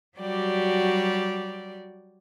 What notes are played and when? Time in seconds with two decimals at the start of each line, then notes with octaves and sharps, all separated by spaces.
0.19 F#3 G3 F#4 G4 D5